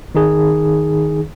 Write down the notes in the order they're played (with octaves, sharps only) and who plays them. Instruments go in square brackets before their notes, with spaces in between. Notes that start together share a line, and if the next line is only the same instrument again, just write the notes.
[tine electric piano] D#3 D#4 G#4